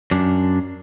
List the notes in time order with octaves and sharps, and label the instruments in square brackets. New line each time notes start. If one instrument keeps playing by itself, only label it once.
[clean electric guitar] F#2 D4